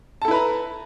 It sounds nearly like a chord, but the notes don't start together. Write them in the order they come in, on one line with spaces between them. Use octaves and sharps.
A5 A4 E4 B4 A#5